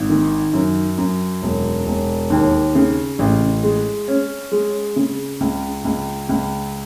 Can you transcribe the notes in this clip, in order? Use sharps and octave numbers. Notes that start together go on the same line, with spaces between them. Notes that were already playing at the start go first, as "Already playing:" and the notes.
Already playing: G#1
D#3
F#2
F#2
E1
E1
D#2
C#3
A1
G#3
C#4
G#3
C#3
C#2
C#2
C#2